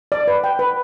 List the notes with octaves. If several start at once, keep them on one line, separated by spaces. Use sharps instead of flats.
D5
B4
G5
B4